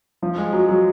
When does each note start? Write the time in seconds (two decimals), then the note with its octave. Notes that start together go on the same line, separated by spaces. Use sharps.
0.22 F3
0.38 G#3
0.53 F#3
0.69 F#3